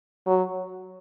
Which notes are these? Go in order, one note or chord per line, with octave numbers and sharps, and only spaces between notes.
F#3